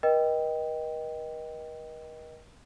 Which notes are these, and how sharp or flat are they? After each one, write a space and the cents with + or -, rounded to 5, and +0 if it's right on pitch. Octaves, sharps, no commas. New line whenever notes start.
A#4 +45 D#5 +0 G5 +0